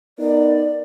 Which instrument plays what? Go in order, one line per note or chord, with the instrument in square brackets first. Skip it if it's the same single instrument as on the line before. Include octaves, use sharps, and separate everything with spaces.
[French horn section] B3 D#4 A#4 [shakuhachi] D5